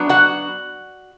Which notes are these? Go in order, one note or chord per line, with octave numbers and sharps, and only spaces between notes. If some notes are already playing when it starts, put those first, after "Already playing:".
Already playing: F#3 B3 D4
F#4 F#5